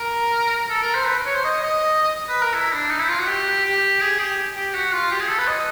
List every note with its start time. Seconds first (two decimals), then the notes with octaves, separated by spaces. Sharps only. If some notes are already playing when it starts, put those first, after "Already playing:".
Already playing: A#4
0.70 A4
0.82 A#4
0.94 C5
1.07 B4
1.26 C#5
1.34 C5
1.44 D#5
1.63 D#5
2.29 B4
2.42 A#4
2.54 E4
2.72 D4
2.90 D#4
2.99 E4
3.09 F4
3.18 F#4
3.27 G4
3.65 G4
4.01 G#4
4.19 G4
4.56 G4
4.74 F#4
4.93 F4
5.11 G4
5.20 G#4
5.29 A4
5.38 B4
5.48 D#5